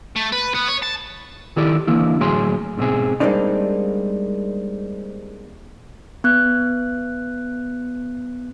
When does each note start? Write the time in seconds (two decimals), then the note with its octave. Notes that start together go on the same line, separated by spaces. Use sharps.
0.16 A3
0.32 B4
0.54 B3
0.68 C#5
0.82 A5
1.56 D#3 E4 G4 A4 D5
1.87 D3 E3 A#3 E4
2.20 D2 A2 F#3 G#4 C#5 C6
2.77 G#2 B2 C4 G#4
3.20 G3 G#3 A#3 C4 D4 D#4
6.24 B3 F#6